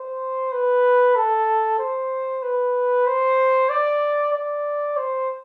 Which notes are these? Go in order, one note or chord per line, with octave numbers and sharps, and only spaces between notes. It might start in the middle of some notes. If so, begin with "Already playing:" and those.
Already playing: C5
B4
A4
C5
B4
C5
D5
D5
C5